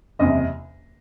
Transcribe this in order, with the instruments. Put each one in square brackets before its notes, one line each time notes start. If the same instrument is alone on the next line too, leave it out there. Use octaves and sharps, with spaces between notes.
[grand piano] F#1 E2 C3 D#5